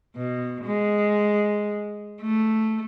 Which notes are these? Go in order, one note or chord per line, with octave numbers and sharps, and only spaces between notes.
B2
G#3
A3